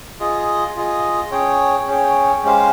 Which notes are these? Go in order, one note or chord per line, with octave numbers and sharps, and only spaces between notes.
F4 G#4 D#5
F4 G#4 D#5
C#4 G#4 C#5 G5
C#4 G#4 C#5 G5
G#3 C#4 G4 C5 F5